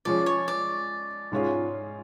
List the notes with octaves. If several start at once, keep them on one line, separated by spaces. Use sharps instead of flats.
F3 G#3 C#4 D5
C#5
D5
G#2 G#3 C#4 F4